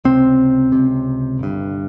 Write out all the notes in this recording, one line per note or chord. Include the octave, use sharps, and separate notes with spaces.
C#2 C3 C4
C#2 C3
G1 G2